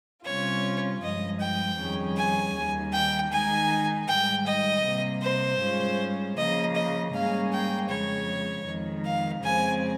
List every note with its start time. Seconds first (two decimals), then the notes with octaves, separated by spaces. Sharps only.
0.25 C3 G3 C#4 F4 C#5
1.02 G2 F3 G#3 D#5
1.40 G5
1.78 F2 D#3 G3 C#4 G#4
2.16 G#5
2.55 D#2 D#3 G3
2.93 G5
3.32 D#3 G#3 D#4 G#5
4.08 G#2 D#3 G3 G5
4.46 D#5
4.84 C3 G3 A#3
5.22 C5
5.60 G#2 G3 C#4 F4 G#4
6.37 C#3 F3 A#3 D#5
6.75 D#5
7.13 G#2 G3 A#3 C#4 G#4 F5
7.52 G5
7.89 F2 C#3 G#3 C#5
8.66 F2 D#3 G#3
9.05 F5
9.43 F2 C#3 G#3 C4 G#5